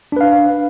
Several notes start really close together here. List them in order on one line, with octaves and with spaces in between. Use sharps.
D4 B4 F5